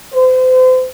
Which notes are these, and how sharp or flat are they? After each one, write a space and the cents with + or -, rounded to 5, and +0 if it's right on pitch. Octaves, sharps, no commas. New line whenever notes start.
C5 -35